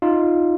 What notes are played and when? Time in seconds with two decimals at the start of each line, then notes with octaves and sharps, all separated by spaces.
0.02 D#4 F4